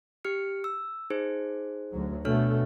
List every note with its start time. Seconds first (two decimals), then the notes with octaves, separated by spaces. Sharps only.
0.24 G4 F6 C#7
0.64 E6
1.10 D#4 G#4 C5
1.92 D2 F#3
2.25 B2 A3 D4 C#5 F6